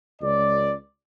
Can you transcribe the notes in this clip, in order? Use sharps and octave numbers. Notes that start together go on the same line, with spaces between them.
C#2 D5